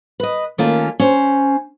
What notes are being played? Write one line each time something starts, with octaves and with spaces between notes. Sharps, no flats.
B4 D#5
D#3 A3 A#3 C#4 F4 A4
C#4 C5